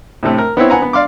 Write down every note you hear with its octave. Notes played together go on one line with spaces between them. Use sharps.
A2 C3 A3
A#4
B3 C4 E4 C#5
B3 F#5 G#5 A#5
B3
D5 F5 C6 D6